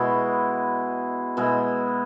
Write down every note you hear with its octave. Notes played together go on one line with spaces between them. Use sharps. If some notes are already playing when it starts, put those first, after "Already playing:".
Already playing: B2 G#3 E4
B2 G#3 E4